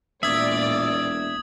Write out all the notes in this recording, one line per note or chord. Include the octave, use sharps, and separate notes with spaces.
E1 A#2 D5 E5 D#6 G#6